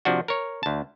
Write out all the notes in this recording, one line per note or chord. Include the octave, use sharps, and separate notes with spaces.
C3 F3 D4 F#4
A#4 C#5
D2 A5